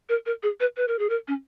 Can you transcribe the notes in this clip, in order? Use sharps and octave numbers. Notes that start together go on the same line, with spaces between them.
A#4
A#4
G#4
B4
B4
A#4
G#4
A#4
C#4